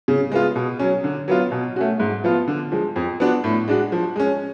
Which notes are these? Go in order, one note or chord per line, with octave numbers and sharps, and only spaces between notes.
C#3
G#3 B3 F4
B2
F#3 C#4
D3
F#3 B3 F4
B2
A3 C#4 F#4
G#2
F3 B3 F4
D3
F3 G#3
F2
F3 B3 D4 F#4
A2
G#3 D4 F#4
F3
G#3 C#4